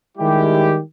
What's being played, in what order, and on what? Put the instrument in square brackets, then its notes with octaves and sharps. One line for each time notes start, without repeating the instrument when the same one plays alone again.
[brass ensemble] D#3 G3 G#3 E4 G4